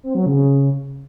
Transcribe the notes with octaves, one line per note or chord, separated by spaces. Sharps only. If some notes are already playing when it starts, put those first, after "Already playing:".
C4
F#3
C#3